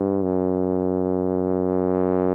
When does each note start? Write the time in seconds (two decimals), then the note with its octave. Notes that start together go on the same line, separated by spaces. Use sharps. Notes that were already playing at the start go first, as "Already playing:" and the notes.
Already playing: G2
0.23 F#2